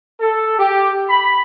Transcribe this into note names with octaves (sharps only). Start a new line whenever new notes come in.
A4
G4
B5